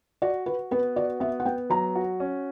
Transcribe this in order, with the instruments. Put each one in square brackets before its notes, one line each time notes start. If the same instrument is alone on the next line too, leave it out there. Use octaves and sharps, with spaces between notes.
[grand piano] F#4 [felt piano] D5
[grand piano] F#4 [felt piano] B4
[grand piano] B3 [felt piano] B4
[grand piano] F#4 [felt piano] D5
[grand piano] B3 [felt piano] E5
[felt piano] F#5
[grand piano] B3 [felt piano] G5
[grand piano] F#3 [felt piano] A#5
[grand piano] F#4
C#4